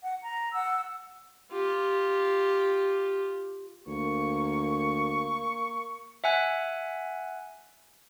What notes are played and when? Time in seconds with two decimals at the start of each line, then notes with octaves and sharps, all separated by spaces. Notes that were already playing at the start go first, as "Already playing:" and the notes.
0.01 F#5
0.21 A#5
0.52 F#5 E6
1.52 F4 G4
3.87 D2 A#3 C#6
6.24 E5 F#5 G#5 F#6